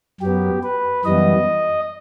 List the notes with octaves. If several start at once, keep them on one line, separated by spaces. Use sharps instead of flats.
F#2 F#3 B3 G4
B4
F#2 E3 G3 B3 D#5